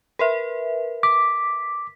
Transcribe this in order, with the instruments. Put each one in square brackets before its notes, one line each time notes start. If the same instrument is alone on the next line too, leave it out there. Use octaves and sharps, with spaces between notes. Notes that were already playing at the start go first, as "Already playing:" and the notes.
[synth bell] A#4 B4 E5
[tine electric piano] D6 [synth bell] B6